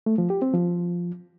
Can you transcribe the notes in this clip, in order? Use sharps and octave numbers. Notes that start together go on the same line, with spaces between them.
A3
F3
G4
C4
F3